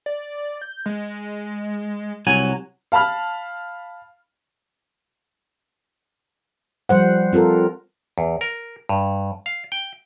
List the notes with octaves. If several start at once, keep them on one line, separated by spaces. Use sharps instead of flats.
D5
G6
G#3
C2 F#3 G#5
F5 A5 B5 F6
F3 G3 C5 F#5
C4 F4 A4 A#4
E2
A#4
G2
F5
G5